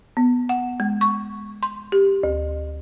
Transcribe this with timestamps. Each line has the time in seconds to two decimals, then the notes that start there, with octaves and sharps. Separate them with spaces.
0.17 B3
0.49 F#5
0.80 G#3
1.01 C#6
1.63 C6
1.92 G4
2.23 D2